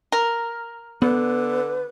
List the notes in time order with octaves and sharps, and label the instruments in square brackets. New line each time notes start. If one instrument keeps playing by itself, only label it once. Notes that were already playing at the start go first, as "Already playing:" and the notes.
[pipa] A#4
[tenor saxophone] D3 [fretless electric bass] B3 [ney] B4